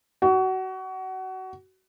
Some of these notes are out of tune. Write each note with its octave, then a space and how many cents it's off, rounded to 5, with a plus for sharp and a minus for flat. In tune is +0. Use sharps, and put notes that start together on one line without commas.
F#4 +25